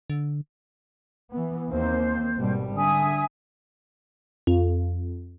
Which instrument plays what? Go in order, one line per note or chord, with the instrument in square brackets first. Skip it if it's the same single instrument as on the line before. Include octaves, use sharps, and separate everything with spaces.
[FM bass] D3
[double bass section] E3 B3
[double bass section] D#2 A#3 C4 [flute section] C5
[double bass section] G#1 B2 G3
[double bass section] D3 [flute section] E5 G#5 D#6
[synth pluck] F2